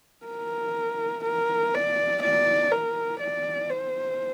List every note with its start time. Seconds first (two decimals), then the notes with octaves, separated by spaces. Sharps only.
0.26 A#4
1.25 A#4
1.74 D5
2.23 D5
2.72 A#4
3.20 D5
3.69 C5